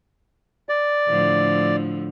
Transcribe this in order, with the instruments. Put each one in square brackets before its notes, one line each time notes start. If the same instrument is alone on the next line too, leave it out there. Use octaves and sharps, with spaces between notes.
[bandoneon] D5
[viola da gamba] A2 D3 F3